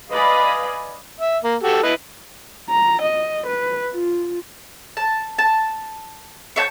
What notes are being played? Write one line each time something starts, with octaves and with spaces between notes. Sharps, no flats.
B4 D5 D#5 F5 G#5 B5
E5
A#3
F#4 G4 A4
E4 B4 D#5
A#5
D#5
B4
F4
A5
A5
C#5 E5 A5 G6